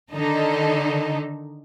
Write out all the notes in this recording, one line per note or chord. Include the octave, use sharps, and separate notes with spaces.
D3 D#3 D#4 A4